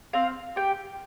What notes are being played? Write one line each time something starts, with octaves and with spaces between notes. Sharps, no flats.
C4 F5
G4 G5